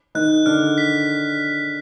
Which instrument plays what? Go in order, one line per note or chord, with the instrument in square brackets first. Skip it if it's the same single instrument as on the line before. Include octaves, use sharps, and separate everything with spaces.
[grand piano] D#3 D#4 [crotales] F#6
[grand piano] D3 D4 [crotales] F6
[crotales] B6